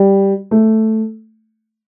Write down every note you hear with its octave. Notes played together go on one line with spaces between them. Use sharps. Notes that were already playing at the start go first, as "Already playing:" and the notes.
Already playing: G3
A3